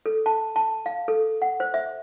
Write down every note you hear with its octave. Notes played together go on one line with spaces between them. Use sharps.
A4
A5
A5
F5
A4
F#5
C5
E5